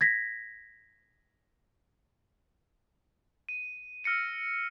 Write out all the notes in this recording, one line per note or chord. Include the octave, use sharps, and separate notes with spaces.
G#6 A#6 B6
D#7
E6 F6 A#6 C#7 D#7